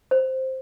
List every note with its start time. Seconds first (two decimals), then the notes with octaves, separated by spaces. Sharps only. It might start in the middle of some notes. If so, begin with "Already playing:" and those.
0.11 C5